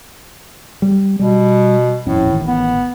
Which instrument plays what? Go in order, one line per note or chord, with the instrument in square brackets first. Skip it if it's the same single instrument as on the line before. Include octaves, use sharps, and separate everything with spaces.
[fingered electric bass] G3
[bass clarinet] B2 [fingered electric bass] G3
[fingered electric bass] D#1 F2 C#4 [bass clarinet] A2
[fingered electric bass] A1 D#3
[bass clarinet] B3